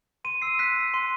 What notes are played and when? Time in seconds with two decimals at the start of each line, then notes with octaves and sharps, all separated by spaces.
0.24 C6 D#7
0.42 E6 C7
0.59 F#6 B6
0.76 F#6
0.94 C6